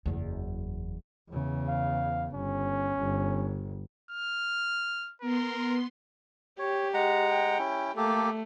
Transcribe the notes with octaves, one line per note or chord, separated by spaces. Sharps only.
F#1 E2
E2 C#3
F5
G1 C#4
G1
F6
B3 A#4 C6
G4 C#5
G#3 F#5 A#5
G5
C#4 E4
A3 A#3 G4 A4